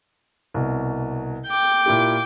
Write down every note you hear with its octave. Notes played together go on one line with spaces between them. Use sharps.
C2 B2
G5 D6
A#2 E4 G4